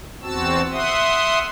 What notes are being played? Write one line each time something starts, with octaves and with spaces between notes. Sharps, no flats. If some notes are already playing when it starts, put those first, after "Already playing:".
E2 C4 F#4 A5 E6
E5 F#5 C6 D#6